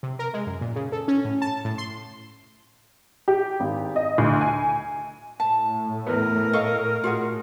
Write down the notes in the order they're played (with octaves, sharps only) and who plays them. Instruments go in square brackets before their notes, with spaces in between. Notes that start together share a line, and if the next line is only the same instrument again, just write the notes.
[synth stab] C3
A#4
G#3
F#2
A#2
C#3
A4
C#4
A2
A5
A2
C6
[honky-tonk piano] G4
G#1
D#5
D2
G#5
[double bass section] A2 [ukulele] A5
[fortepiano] E2 B3 [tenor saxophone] A#4
[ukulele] A4 F5 [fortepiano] D#5 C#6
[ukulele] F4 G#4 F#5 [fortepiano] F#4